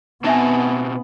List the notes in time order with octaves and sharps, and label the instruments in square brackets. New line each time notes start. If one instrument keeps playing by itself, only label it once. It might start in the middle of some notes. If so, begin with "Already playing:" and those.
[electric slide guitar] B2 C4 A5 [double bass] B3 [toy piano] D#4 E5 G#5